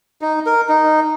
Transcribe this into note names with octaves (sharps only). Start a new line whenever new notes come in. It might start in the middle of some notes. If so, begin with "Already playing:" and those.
D#4
A#4
D#4